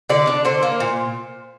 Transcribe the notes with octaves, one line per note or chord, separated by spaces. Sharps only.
D3 D5
D4
D3 C5
A#3
A#2